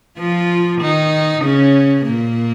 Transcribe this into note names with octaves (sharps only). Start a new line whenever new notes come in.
F3 F4
D#3 D#4
C#3 C#4
A#2 A#3